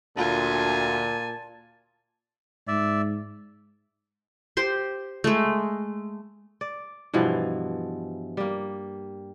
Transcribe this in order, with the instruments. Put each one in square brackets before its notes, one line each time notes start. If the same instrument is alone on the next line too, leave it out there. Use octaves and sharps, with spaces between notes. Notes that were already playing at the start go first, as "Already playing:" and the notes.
[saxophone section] D2 [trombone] A#2 [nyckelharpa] F4 G#5 [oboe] A5
[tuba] G#2 [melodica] D5 E5
[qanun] G4 C5 C6
G#3 A3
[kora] D5
G2 B2 E3 F3
G3 A#3